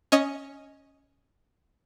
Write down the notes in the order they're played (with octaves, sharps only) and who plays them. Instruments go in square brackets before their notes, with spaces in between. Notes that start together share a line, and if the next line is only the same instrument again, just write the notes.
[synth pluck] C#4 D#5